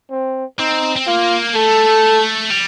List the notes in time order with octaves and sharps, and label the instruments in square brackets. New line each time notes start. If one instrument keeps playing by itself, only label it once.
[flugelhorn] C4
[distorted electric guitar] C4 [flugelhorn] D#4
[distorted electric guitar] C4
[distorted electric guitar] A#3 [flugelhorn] F4
[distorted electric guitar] A3 [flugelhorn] A4
[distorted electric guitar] G3